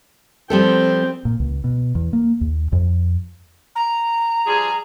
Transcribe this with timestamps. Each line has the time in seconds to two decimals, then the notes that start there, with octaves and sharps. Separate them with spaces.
0.50 F3 G3 C4 A4 G5
1.25 A#2
1.40 C#2
1.64 B2
1.95 E2
2.13 A#3
2.41 D#2
2.72 F2
3.76 A#5
4.47 F3 G3 G#4